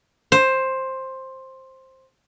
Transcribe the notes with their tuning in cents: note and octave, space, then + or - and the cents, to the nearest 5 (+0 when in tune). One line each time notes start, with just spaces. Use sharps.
C5 +10